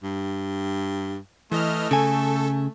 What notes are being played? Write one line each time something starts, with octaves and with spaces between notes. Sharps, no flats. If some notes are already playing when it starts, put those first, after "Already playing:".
G2
E3 A3 D#5 F6
C#3 A4 G#5